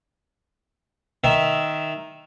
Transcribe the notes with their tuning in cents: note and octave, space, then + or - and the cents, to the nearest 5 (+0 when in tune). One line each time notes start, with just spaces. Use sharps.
D#3 +0 E5 +0